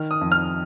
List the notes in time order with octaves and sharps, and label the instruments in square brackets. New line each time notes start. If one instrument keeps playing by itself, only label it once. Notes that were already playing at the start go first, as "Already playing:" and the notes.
Already playing: [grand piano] D#3 F6
D#6
F2
F6